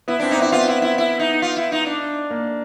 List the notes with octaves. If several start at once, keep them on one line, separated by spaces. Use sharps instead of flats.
B3 E4
C4 D4
D#4
B3
E4
B3 F4
E4
E4
E4
D#4
F4
E4
D#4
D4
A#3